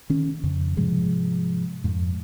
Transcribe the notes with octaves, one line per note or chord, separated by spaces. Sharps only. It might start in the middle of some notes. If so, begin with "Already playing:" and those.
D#3 C#4
F2 C#3
G#2 C3 F3 G#3
F2 G#2